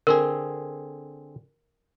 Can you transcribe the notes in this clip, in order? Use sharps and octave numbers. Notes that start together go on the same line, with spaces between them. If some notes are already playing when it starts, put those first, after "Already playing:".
D3 C4 G#4 A#4